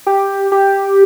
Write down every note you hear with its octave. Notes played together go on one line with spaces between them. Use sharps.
G4
G4